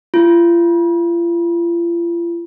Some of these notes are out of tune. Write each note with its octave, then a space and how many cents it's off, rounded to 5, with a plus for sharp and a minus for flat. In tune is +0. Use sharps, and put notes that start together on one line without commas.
F4 -40